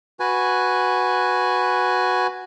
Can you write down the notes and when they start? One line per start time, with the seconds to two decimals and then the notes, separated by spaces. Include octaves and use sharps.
0.20 F#4 B4 G#5